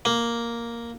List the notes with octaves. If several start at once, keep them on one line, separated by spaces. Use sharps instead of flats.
A#3